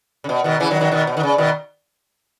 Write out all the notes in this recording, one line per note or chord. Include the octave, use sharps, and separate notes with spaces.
C#3
B2
B2 D#3
C#3 E3
D#3 F#3
D#3 F#3
B2 D#3
B2
D#3
C#3
B2 D#3